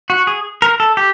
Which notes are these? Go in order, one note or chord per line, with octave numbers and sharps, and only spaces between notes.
F#4
G#4
A#4
A4
G4